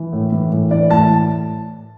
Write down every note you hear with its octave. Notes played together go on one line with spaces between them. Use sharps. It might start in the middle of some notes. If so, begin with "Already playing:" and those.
Already playing: E3
A2
E3
A2
E3 D5
A2 A5